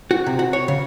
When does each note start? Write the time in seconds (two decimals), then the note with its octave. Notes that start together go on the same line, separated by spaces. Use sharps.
0.11 F#4
0.26 C3
0.39 F#4
0.53 C#5
0.68 C#3